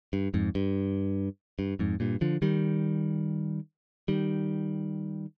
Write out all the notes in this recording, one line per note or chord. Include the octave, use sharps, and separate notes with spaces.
G2
F2 G#2
G2
G2
F2 G#2
G2 A#2
D3 F3
D#3 G3
D#3 G3